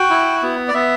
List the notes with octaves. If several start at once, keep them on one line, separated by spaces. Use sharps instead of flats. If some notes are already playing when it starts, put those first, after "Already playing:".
Already playing: F#4 G5
E4
B3
D5
B3 E5